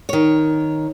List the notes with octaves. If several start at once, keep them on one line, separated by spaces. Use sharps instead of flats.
D#3 C#5